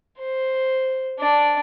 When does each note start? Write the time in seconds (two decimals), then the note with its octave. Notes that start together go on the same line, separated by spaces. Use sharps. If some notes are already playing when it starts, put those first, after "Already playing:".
0.20 C5
1.19 D4 D5